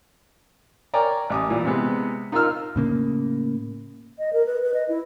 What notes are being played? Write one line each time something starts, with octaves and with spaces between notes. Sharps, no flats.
A#4 C#5 D5 G5 G#5 A#5
A1 D6 D#6
A#2 E3
C3 G#3 B3
D#4 F4 A#4 F5 E6 F6
A2 C#3 A#3
D#5
A#4
B4
B4
D#5
E4